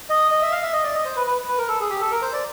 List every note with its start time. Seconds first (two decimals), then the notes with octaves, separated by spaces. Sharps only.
0.10 D#5
0.31 D#5
0.42 E5
0.52 F5
0.63 E5
0.73 D#5
0.84 D5
0.94 D#5
1.05 C5
1.16 B4
1.27 B4
1.48 B4
1.58 A#4
1.68 A4
1.80 G#4
1.90 G4
2.01 A4
2.12 A#4
2.22 C5
2.33 D5